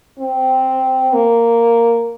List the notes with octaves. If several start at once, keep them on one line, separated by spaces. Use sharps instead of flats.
C4
A#3